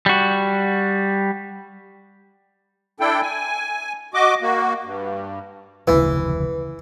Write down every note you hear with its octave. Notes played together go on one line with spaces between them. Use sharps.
G3 F#4
D4 E4 A4 G5
G#5
F#4 D#5 D6
A#3 F#4
G2
F1 D2 C#3 E3 B4